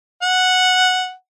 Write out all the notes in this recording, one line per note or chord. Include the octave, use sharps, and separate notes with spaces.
F#5